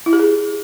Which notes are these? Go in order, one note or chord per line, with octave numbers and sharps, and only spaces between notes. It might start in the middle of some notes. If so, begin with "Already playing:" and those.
E4
G4
G#4